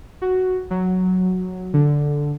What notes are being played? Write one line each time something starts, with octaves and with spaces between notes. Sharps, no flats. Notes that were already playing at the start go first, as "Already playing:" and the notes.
F#4
F#3
D3